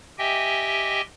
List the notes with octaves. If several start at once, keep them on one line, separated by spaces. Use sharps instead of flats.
G4 D#5 E5 G5 G#5